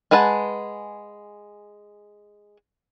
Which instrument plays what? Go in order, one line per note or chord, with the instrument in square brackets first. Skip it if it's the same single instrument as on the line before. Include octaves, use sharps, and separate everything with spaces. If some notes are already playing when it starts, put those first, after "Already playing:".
[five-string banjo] G#3 G#4 B4 F#5 A5